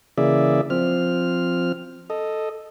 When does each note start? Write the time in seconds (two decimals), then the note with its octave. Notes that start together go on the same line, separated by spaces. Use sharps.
0.18 C#3 E3 A#3 G#4 D5 E5
0.70 F3 C4 F6
2.10 A4 D#5